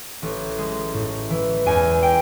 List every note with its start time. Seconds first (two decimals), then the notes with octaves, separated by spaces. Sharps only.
0.22 A1
0.58 G#3
0.94 A2
1.30 E3
1.66 E2 G#5
2.03 G5